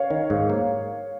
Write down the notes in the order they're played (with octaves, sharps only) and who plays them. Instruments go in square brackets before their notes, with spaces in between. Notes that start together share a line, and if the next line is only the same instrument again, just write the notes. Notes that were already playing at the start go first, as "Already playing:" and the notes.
Already playing: [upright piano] C#5 F5
[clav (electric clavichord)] D#3
G#2
A#3